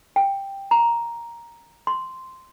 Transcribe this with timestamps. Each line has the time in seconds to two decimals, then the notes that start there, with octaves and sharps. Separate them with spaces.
0.16 G5
0.71 A#5
1.87 C6